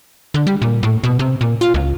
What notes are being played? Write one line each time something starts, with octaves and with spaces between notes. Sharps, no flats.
D3
G3
A#2
A2
B2
C3
A#2
F4
C#2